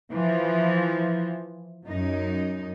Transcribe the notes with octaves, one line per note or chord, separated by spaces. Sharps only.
E3 F3
F#2 D#4